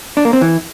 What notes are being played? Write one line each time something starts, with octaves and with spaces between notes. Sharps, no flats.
D4
A#3
C4
E3